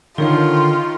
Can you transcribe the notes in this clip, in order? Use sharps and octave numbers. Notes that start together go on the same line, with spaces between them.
D3 D#3 F4 A#4 C#5 F5